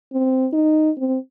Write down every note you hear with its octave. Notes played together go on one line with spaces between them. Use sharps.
C4
D#4
C4